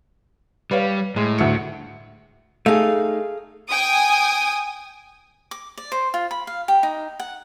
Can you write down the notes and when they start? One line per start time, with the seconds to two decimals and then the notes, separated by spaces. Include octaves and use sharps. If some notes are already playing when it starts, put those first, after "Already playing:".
0.71 G3 B4 C#5 F5
1.16 A2 G#3
1.38 D2 E5 C#7
2.66 A3 D#4 G#4 F5
3.71 G5 G#5 D#6
5.51 D6
5.78 D5
5.92 C5
6.14 F4
6.31 B5
6.47 F5
6.68 G4
6.83 D#4
7.20 F#5